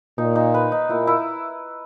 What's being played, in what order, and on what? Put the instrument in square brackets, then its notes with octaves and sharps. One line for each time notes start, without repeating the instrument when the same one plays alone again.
[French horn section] A#2 [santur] D#4
[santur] D#4
B4
D#4
[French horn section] A#2 [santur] E4
[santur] E4